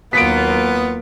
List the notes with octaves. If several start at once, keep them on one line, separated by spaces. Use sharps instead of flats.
D#2 F#3 A#3 B3 F4 B6 D7